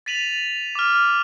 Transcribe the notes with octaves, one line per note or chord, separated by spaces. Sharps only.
A6 B6 D#7 F7 F#7
D6 F6